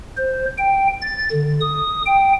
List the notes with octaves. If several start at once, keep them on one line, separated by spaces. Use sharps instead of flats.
C5
G5
A6
D3
D#6
G5